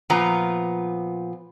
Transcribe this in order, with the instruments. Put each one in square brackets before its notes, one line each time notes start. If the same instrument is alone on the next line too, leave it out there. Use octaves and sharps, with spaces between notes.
[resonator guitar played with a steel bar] A#2 F3 B3 A#5